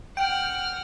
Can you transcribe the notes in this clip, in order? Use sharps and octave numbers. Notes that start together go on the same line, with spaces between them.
F#5 G5 F6